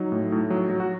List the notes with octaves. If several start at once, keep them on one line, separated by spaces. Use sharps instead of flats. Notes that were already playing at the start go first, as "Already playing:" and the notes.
Already playing: F#3 D#4
A2
A2
F#3
F#3
F#4